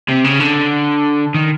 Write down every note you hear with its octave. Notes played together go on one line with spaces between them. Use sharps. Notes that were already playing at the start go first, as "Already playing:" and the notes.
C3
C#3
D3
D#3